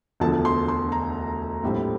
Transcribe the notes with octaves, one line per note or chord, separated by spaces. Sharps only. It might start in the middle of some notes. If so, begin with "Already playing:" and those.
E1 D2 D3 F3 A5
C6
C6
A#5
A#1 A2 G3 C4